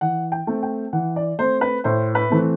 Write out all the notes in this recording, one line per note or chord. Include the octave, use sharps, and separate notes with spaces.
E3 F#5
G5
A3 C4
G5
E3 F#5
D5
A3 C4 C5
B4
A2 C5
B4
E3 A3 C4